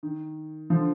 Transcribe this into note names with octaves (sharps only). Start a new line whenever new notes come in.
D#3
D3 F3